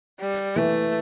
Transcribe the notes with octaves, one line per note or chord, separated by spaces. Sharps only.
G3
E3 A3